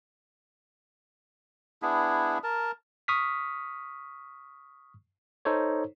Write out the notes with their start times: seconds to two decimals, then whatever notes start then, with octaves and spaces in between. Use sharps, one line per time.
1.82 B3 D4 E4 G#4
2.43 A#4 A5
3.08 C#6 D#6 F6 B6
5.45 D#4 A4 C5 C#5